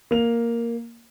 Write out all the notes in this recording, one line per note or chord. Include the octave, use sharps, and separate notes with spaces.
A#3 F7